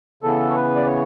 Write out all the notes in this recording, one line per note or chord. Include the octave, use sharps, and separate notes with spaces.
C#3 E3 B3 A4
C#5
B4
D5
C#5